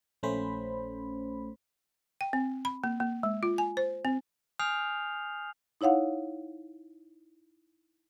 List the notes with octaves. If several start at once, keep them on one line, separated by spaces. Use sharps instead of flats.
A#1 A3 C#4 C5 B5
G5
C4
B5
A#3
A#3
G#3
F4
G#5
C5
C4
G#5 D#6 F6 G6 C7 F7
D#4 E4 C#5 F5 F#5